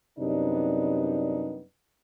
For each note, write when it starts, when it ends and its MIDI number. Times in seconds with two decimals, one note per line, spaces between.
0.19 1.61 42
0.19 1.61 48
0.19 1.61 55
0.19 1.61 59
0.19 1.61 62
0.19 1.61 63